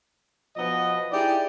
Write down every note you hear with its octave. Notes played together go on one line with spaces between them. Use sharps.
B2 F3 B3 D#5
D#4 E4 G4 G#4 D5